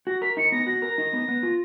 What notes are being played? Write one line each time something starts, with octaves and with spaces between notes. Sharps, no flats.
F#4 A#6
A#4 B6
D#4 C#7
B3 A#6
F#4 A#6
A#4
D#4
B3
B3
F4